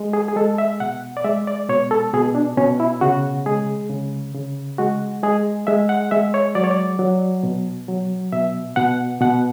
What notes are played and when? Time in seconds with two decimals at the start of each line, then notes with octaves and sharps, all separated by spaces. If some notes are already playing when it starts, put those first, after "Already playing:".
Already playing: G#3
0.13 G#4
0.28 G#4
0.36 G#3 A4
0.58 E5
0.80 B2 F#5
1.17 D5
1.24 G#3 E5
1.47 D5
1.69 B2 C#5
1.91 A4
2.14 B2 G#4
2.35 D4
2.57 B2 C#4
2.80 E4
3.01 C#3 F#4
3.46 G#3 G#4
3.90 C#3
4.34 C#3
4.78 G#3 F#4
5.23 G#3 G#4
5.67 G#3 E5
5.89 F#5
6.11 G#3 E5
6.34 C#5
6.55 F#3 D5
6.64 C#5
6.71 D5
6.99 F#3
7.43 B2
7.88 F#3
8.33 B2 E5
8.76 B2 F#5
9.21 B2 F#5